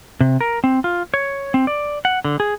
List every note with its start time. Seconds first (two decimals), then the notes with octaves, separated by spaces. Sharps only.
0.21 C3
0.41 A#4
0.64 C4
0.84 F4
1.14 C#5
1.54 C4
1.67 D5
2.05 F#5
2.25 D3
2.40 G#4